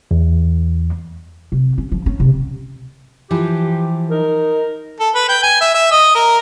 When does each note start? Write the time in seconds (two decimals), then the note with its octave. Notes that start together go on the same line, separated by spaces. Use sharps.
0.11 E2
1.52 C3
1.78 C#4
1.92 F3
2.06 C#4
2.20 C3
3.31 E3 F3 G4
4.10 D#4 A#4
5.00 A4
5.15 B4
5.29 G5
5.43 G#5
5.61 E5
5.74 E5
5.92 D#5
6.15 A#4